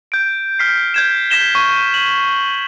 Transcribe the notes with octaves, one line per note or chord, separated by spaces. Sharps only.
G6 D7
F6 B6 C7
G6 G#6 E7
G6 A#6 B6 E7 G7
C#6
F#7